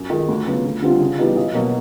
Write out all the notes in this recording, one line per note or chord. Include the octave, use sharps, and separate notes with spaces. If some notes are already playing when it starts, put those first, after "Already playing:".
Already playing: F#2
D#3 G#3
D2
C#3 F#3 B3
D2
D3 G3 C4 F4
C#3
E3 G3 B3 D#4
B1
B2 F#3 A#3